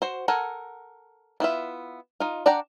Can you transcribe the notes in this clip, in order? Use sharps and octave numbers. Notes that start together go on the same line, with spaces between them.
F#4 C5
A4 A#4 F#5 G#5
B3 E4 F4 E5
D#4 F4
D4 D5 F#5 G5 A#5